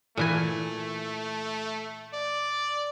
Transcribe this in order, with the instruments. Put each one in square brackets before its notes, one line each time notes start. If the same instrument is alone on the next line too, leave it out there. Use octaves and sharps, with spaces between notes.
[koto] A#2 E3 G#5 [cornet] A3
[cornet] D5